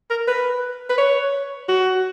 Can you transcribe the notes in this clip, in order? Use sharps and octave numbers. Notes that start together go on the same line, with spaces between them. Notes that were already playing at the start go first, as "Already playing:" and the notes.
A#4
B4
B4
C#5
F#4